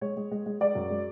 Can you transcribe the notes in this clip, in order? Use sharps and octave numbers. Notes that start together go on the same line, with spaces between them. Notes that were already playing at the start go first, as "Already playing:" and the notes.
G#3 C#5
G#3
G#3
G#3
G#3 D5
F#2
G#3